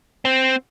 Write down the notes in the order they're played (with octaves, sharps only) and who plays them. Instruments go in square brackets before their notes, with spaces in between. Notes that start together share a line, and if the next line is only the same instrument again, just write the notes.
[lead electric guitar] C4